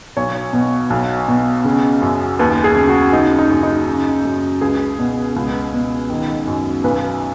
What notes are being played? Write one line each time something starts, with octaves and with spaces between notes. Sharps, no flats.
B1 C#5
B2
B1
B2
C#3
F#2
D#2 B4
G#4
C#3
F#4
C#3 D#4
D#4
F#2
D#4
C#3
F#2
C#2 G#4
B2
C#2
B2
D#3
F#2
B1 B4